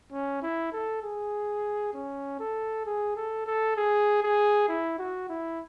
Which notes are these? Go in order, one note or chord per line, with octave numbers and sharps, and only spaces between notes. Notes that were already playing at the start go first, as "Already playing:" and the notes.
C#4
E4
A4
G#4
C#4
A4
G#4
A4
A4
G#4
G#4
E4
F#4
E4